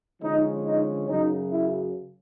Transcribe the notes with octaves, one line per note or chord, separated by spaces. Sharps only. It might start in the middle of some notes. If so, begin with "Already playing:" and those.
D3 F3 G#3 C#4 D#4
D#4
F#2 C#3 F#3 D#4
E4